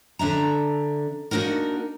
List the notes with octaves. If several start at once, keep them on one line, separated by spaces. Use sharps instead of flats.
D3 D4 E5 A#5
A#3 D4 D#4 F#4 A#4